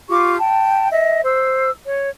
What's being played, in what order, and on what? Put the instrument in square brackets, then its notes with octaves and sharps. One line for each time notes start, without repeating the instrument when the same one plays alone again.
[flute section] F4 G4 C#6 D6
G5 A5
D#5 E5
C5 E6
C#5